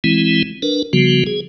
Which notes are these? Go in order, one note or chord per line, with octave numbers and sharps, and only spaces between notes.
E3 G#3 C4 E4
D4 A#4 B4
C#3 F3 G3 B3 F#4
G#4